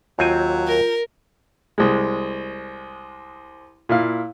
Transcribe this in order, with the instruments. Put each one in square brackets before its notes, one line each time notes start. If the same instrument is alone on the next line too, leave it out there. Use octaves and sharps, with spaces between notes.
[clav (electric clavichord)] D#2 C4 G#5 [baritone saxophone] F#3 [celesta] F4 G6
[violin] A#4
[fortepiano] C2 G#3
A#2 E4 F5